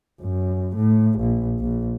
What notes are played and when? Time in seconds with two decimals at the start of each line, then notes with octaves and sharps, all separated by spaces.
0.21 F#2
0.76 A2
1.20 A#1
1.60 A#1